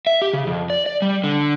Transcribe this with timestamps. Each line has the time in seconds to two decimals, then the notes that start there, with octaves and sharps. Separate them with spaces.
0.07 E5
0.22 G4
0.33 C#3
0.47 F2
0.70 D5
0.86 D5
1.02 G3
1.24 D3